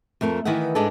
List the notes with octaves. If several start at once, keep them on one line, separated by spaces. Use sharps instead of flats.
F2 A3 A#4 C5
D#3 E3 B3 E5 F#5
G#2 G#3 B3 D4 D#4 A4